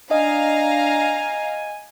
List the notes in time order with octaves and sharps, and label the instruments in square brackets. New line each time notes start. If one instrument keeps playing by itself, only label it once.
[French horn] D4 [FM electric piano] D#5 [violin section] F5 A#5 [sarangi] G#5